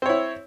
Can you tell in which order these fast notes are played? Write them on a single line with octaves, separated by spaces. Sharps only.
C4 C#5 E4